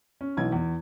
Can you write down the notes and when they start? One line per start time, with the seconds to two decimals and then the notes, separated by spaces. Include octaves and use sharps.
0.21 C#4
0.37 B1 E3 G#6
0.52 E2